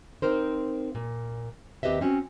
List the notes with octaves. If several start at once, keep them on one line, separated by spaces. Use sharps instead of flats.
C4 D#4 A#4 C5
A#2
D#2 C4 G4 B4 D#5 E5
C4 C#4 F#4